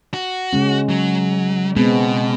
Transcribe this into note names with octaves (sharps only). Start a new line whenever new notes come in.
F#4
C#3 G#3 C#4
F#3
B2 G#3 B3 C4